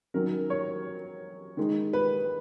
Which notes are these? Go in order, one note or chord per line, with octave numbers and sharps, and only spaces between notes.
D#3 F#3 C#4 A#4
C#5
D#3 G#3 D#4
B4